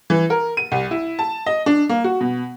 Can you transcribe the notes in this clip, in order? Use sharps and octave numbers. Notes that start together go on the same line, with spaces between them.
E3
A#4
D#7
C2
E4
A5
D#5
D4
A#3
F#4
B2